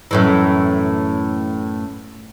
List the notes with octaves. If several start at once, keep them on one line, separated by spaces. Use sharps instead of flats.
F#2 A2 E3